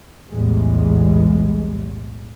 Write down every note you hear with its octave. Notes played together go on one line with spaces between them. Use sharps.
B1 E2 A2 G3 G#3